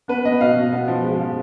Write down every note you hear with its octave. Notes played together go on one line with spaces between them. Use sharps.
B3 B4
B3 D#5
B2 F5
B2
B3
F3
G#3
F3